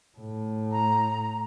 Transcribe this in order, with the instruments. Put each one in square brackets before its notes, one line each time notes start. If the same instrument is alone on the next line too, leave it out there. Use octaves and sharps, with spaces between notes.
[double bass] A2
[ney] A#5